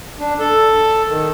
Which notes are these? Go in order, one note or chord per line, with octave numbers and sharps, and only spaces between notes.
D4
A4
D#3